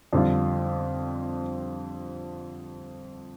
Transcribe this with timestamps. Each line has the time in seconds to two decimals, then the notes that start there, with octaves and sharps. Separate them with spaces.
0.13 F2 D3 G3 F4